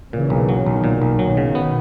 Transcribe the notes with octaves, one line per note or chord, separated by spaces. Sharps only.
A#2 C#3 E3
B1
F#3
B1 B2 D#3
A#2
B1
B2 D#3 F#3
C#3
B3